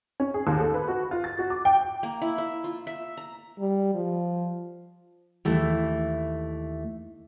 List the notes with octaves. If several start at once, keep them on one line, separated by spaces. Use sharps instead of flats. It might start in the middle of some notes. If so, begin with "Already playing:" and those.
C#4
G#4
D#2
A4
B4
F#4
F4
A6
F#4
D6
G5
A#3
E4
E5
F4
E5
A#5
G3
F3
D#2 E3 A3